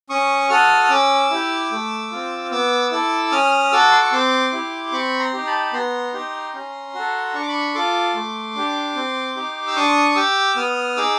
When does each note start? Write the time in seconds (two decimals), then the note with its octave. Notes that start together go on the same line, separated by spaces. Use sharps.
0.10 C#4 C#6 D#6
0.49 F#4 A4 D#6 F6
0.84 F6
0.90 C#4 D6 E6
1.30 E4 G4
1.71 A3
2.11 C4 F4
2.51 B3 D6 E6
2.91 E4 A4 D6 E6
3.32 C#4 D#6 F6
3.72 F#4 A4 D6 E6
3.92 C6
4.01 C#6
4.12 C4 C6 D6
4.52 E4 G4
4.92 C4 B5 C#6
5.19 A#5 C6
5.33 D#4 G4
5.47 A5 B5
5.73 B3 A#5 C6
6.13 D#4 G4
6.54 C#4
6.94 F#4 A4
7.34 D4 C#6
7.42 D6
7.49 B5 C#6
7.75 F4 A4 C6 D6
8.15 A3
8.55 D4 G4
8.95 C4
9.36 D#4 G4
9.67 E6
9.76 D4 C#6 D#6
10.11 D#6
10.16 G4 D6 E6
10.56 B3 D#6 F6
10.97 D#4 G#4 D6 E6